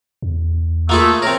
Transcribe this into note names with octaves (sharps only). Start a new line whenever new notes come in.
E2
A3 A#3 F4 G#4
C4 A#4 C#5 A#5